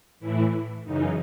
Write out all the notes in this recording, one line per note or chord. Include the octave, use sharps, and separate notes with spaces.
A2 E3 E4
F#2 C#3 E3 D#4